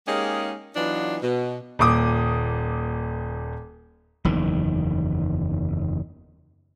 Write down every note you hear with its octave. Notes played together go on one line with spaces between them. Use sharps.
G#3 A#3 C#4 D#4 G4 G#4
E3 F#3 B3 D4 D#4 F4
B2
D#1 A#2 D6 D#6
F#1 E2 D#3